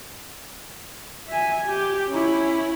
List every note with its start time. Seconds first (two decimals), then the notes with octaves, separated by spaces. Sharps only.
1.28 E5 G#5
1.65 G4
2.09 C#4 E4